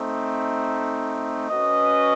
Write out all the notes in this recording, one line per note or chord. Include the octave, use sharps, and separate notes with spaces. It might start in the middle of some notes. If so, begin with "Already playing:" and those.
Already playing: A3 C4 D#4
C#4 F#4 B4 D#5